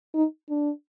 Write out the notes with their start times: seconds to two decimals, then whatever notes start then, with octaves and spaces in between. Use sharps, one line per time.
0.15 D#4
0.50 D4